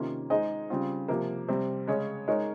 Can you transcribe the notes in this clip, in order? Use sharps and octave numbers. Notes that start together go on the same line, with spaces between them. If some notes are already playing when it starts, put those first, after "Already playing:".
Already playing: C3 D#3 A#3 C#4 F4
G#3 D#4 G#4 C5 D#5
C#3 G3 C4 F4
C3 F3 A#3
C3 G3 C4
C#3 G#3 C#4 G#4 C#5
G#3 D#4 A#4 C#5